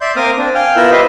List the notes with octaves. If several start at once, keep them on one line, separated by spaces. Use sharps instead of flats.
D5 E5 C6 G6
A#3 C4 A#4 D6 D#6 F6
C4 D4
F5 G5 G#5 F6
B3 E4 F4 A#4 E6 F#6
E4 G4 B4 C5 D#5 E5